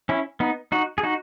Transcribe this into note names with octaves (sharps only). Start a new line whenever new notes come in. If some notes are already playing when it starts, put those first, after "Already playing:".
C#4 E4
B3 D#4
D#4 F#4
G#4
D#4 F#4